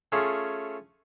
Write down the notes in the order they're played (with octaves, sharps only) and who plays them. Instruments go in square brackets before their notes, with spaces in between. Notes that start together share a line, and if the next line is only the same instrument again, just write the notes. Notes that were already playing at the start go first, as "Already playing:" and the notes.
[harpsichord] A3 C#4 F4 G#4